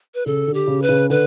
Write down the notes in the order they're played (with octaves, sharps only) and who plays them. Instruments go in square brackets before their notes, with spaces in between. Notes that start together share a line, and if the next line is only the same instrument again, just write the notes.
[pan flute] B4
[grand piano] C#3 [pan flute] A4
[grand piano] D3
[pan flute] G4
[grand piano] C#3
[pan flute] B4
[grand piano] C#3
[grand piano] D3 [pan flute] B4